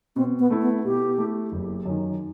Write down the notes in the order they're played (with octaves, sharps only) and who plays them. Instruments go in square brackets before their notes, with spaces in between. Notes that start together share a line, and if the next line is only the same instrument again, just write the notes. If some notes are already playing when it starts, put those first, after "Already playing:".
[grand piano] B2 [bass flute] C4
[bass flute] B3
[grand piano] A3 E4
[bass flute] B3
[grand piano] B2 [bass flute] G4
[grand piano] A3 E4
F#1
F#2 D#3